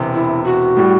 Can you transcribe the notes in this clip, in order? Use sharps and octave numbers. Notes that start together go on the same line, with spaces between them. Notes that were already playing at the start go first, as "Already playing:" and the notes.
Already playing: E1 E2 C3
E4
F#4
A2 G3